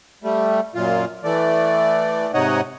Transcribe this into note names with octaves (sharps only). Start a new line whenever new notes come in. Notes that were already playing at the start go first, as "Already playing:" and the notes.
G3 A3
F#2 A#2 F4
E3 A3 D5
G#2 C3 D#4 C#5 D#5 F#5